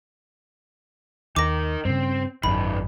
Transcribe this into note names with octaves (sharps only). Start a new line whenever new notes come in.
D#2 D#3 A#4 D6 A#6
G2 C#3 C4
G#1 F#2 B2 D#3 B5